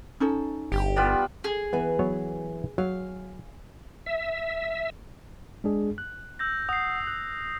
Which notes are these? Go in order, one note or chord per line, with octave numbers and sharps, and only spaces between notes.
C#4 D#4 A4
G1 G4
G3 B3 F4
G#4
E3 B3 B4 G#5
F#3 B3 C#5
F#3 F5
E5
G#3 D4 G#4
F#6
E6 G6 A#6
F#5 D#6 C7
F#6